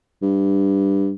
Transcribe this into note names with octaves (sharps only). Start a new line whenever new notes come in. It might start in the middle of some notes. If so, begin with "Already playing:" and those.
G2